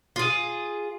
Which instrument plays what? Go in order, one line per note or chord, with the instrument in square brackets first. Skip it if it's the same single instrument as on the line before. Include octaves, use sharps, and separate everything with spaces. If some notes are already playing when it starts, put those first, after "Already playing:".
[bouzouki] F4 G#4